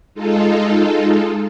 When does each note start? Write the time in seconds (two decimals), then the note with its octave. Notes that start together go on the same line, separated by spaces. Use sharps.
0.14 G#3 D#4 F4 A4